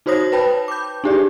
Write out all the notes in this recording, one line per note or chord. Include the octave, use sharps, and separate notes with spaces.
D#4 F#4 C5 C#5 D#6 A#6
B4 C#5 G5 A5 B5
D6 G6
D4 D#4 G4 G#4 D5